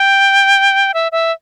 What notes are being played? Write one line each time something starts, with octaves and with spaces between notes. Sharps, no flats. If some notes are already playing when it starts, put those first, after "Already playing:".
Already playing: G5
E5
E5